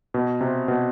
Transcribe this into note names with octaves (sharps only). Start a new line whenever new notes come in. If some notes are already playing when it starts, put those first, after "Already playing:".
B2
C3
B2